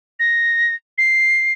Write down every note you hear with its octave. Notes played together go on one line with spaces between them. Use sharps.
A#6
C7